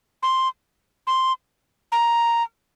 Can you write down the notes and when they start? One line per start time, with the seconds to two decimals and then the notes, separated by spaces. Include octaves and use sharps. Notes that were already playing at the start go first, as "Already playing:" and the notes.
0.23 C6
1.07 C6
1.92 A#5